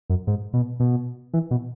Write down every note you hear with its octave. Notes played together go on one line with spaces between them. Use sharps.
F#2
G#2
B2
B2
E3
B2